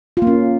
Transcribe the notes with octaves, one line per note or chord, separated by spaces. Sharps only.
F4
A#3
C#4